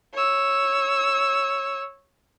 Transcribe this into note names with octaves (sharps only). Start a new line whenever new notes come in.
C#5 E6